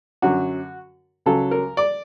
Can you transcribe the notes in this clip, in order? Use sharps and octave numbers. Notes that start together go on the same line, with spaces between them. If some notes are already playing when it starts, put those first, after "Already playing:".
F#2 D3 F#3 F#4
C#2 C#3 F#3 A4
A#4
D5